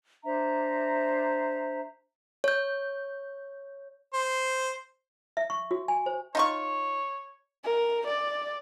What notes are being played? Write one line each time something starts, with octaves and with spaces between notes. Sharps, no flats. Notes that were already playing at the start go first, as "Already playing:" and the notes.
D4 C5 E5 A#5
C#5 G6
C5
E5
C#6
F#4
G#5
C5
D#4 F4 C#5 C#6
A#4
D5